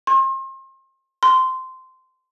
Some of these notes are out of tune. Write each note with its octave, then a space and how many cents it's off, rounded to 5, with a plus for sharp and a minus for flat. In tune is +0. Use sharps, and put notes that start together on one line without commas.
C6 +35
C6 -15